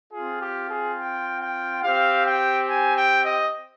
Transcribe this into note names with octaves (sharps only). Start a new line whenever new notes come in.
C4 F4 G#4
G4
G#4
G5
G5
C4 G4 F5
G5
G#5
G5
D#5